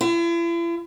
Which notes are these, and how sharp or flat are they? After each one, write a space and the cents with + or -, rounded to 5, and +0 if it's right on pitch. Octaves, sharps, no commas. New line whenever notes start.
E4 +45